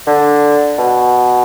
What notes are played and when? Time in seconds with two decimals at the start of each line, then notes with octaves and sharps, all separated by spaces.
0.07 D3
0.78 B2